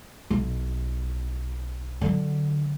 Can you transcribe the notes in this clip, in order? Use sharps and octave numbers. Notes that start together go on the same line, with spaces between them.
B1
D3 F#3